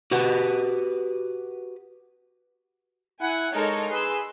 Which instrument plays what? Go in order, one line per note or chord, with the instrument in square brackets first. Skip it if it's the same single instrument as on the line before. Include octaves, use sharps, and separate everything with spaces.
[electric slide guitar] F#4 G4 B4 F#5
[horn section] E4 F#5 [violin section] G#5
[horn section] G#3 A#4 [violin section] D#4 A4 C#5
[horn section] G#4 B4 [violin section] C6 E6